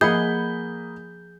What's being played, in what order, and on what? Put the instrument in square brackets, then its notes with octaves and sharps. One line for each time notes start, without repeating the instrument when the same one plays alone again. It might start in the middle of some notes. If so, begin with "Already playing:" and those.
[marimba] F3 [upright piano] A#3 D#5 B5 [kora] G#4 F#5 [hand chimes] G6